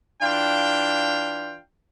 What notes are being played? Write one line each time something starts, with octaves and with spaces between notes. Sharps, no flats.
E3 D4 F4 F5 G5